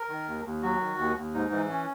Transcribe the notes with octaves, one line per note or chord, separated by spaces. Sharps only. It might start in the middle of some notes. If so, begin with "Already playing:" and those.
Already playing: A#4
D#3
D#2
D#2
F#3 F#4
D#3
D#2
D#2
G#2 D#4
E3
C#4